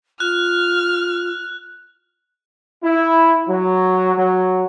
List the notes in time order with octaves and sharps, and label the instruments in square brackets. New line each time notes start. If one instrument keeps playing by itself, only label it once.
[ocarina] F4 [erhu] F6 [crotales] F#6
[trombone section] E4
F#3
F#3